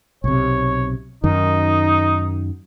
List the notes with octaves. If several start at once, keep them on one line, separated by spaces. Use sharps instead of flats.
B1 C3 C#5
F#2 D#3 D#4